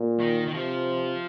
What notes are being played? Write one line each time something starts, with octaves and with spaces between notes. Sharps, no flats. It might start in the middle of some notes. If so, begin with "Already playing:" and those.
Already playing: A#2
D#3
D#3
C3 F3